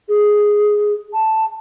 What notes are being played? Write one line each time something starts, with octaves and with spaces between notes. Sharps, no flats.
G#4
A5